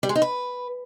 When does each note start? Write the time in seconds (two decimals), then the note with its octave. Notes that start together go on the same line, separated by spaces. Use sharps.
0.03 G3
0.09 G#3
0.15 D#4
0.22 B4